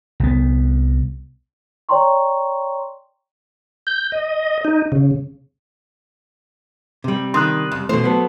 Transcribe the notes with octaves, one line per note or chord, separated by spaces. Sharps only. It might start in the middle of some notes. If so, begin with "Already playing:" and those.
C2 B3
C#5 D5 G5 A#5 C6 C#6
G6
D#5
D#4
C#3
C3 G3
D#3 C6 D#6 F#6
F2
B2 E3 A3 C5
F#3 B3 A4